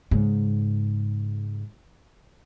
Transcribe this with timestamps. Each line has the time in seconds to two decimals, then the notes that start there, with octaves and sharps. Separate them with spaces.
0.11 G#2 C#3